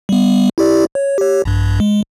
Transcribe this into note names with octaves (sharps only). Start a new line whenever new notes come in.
G3 B3
E4 G4 D5
C#5
G4 C#5
A#1 G2
G#3